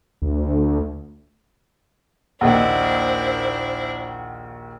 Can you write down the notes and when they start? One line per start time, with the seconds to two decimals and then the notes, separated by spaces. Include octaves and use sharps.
0.22 D2
2.41 A#1 D#2 A#2 D4 E4 C5 D#5 F#5